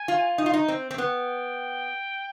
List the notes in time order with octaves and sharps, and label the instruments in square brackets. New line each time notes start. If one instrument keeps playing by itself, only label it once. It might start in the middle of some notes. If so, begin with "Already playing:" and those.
Already playing: [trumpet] G#5
[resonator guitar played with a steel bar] F4
D#4
F4
D#4
C4
C4
[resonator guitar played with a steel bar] B3 [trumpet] G5